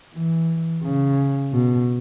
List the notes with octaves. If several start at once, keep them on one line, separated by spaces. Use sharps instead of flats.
E3
C#3
B2